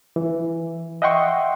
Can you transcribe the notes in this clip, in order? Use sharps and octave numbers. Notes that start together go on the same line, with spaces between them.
E3
D#5 E5 F#5 G5 C6 C#6